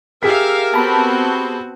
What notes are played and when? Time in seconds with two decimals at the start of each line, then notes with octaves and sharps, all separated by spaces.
0.23 G4 G#4 A#4 E5 F5 B6
0.74 B3 C4 F#4 A5 B5